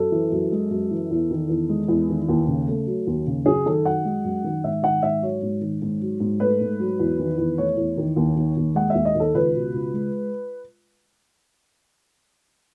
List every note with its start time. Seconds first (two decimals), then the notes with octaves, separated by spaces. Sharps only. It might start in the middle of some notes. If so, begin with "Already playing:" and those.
Already playing: F#2 A4
0.12 E3
0.32 F#2
0.52 G#3
0.71 F#2
0.91 E3
1.11 E2
1.31 D#3
1.50 E2
1.69 G#3
1.88 E2
2.08 D#3
2.29 D#2
2.48 C#3
2.68 A3
2.86 F#3
3.07 D#2
3.27 C#3
3.46 F#2 G#4
3.66 D#3 A4
3.85 F#2 F#5
4.05 G#3
4.24 F#2
4.44 D#3
4.63 G#2 E5
4.83 D#3 F#5
5.03 G#2 E5
5.22 F#3 C#5
5.42 G#2
5.61 D#3
5.82 G#2
6.01 F#3
6.20 G#2
6.40 A3 B4
6.60 G#2
6.80 F#3
7.00 E2
7.19 D#3
7.38 E2
7.58 A3 C#5
7.77 E2
7.97 D#3
8.16 D#2
8.36 D#3
8.57 D#2
8.75 G#3 F#5
8.90 D#2 E5
9.05 D#5
9.15 D#3
9.20 A4
9.34 C#2 B4
9.54 B2
9.74 C#2
9.94 G#3